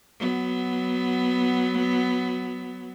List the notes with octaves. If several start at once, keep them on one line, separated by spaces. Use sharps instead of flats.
F#3 B3